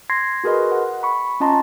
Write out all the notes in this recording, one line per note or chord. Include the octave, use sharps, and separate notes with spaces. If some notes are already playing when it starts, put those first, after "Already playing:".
C6 G#6 A#6 C7
F#4 G#4 A#4 B4 D#5 C6
F#5
B5 C#6
C#4 F4 D#5 A5 A#5 C6